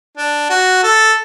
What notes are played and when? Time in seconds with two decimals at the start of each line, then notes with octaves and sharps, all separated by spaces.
0.18 D4
0.50 F#4
0.84 A4